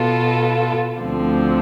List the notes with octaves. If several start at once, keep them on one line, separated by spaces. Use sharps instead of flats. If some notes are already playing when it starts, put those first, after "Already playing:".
Already playing: B2 B3 F4 A4
D2 D3 F3 C4